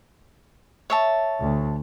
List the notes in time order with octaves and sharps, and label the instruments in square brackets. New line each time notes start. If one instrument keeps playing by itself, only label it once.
[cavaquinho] C#5 E5 A5
[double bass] D2